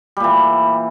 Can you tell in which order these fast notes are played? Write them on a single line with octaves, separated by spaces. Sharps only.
G3 A#2 E3